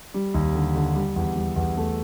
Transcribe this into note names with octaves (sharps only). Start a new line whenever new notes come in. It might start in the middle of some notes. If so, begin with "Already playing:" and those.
G3
D#2
D3
D3
G3
E2
G3
E2
A3